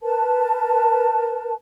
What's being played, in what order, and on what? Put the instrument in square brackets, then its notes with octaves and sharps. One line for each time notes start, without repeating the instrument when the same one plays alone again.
[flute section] A#4 B4 A5